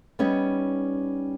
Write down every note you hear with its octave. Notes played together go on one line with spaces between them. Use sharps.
G3 B3 C#4 D#4